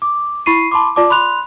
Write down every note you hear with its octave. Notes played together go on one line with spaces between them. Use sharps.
D6
E4 B5 C#6 C7 D#7
A5 B5 C6 D6
F4 D5 A5 D6
B5 C6 F#6 F7